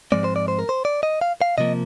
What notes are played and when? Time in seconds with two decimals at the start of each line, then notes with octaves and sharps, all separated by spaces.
0.12 G#2 F3 G#3 C4 D5
0.24 C5
0.36 D5
0.48 C5
0.59 A#4
0.69 C5
0.85 D5
1.03 D#5
1.21 F5
1.42 F5
1.58 C3 F3 A#3 D#5